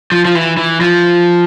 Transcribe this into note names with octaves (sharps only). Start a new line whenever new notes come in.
F3
F3
E3
E3
F3